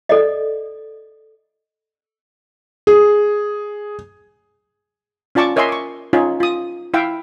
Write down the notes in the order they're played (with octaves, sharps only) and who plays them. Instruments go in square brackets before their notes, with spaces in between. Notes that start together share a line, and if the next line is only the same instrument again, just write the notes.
[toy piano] A4 D5 D#5
[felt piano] G#4
[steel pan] C#4 F4 D5 A5 C#6 D6
A#4 C#5 D#5 E5 G#5 C6
C#6 D6
C#4 D#4 F4 G#4 C#5
F4 D#6
E4 E5 F5 G5